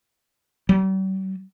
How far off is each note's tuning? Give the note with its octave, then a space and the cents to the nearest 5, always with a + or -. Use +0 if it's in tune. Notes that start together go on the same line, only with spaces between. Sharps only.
G3 -45